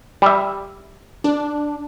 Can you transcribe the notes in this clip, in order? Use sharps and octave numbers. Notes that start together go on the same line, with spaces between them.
G3 E5
D4